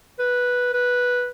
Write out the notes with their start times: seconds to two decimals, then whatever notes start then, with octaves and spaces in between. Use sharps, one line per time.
0.19 B4
0.73 B4